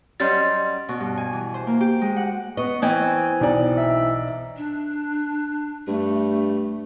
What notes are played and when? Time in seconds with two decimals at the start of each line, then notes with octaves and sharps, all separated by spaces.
0.20 F#3 G3 C#4 D#5 C6 A6
0.89 B2
1.00 G2
1.17 G#5
1.32 E3
1.54 C5
1.67 A#3
1.81 G4
2.01 G#3
2.17 F#5
2.57 B3 D#5 C#6
2.82 E3 C4 D#5 G#5
3.41 B1 D#4 D5
3.77 E5
4.57 D4
5.87 G2 A3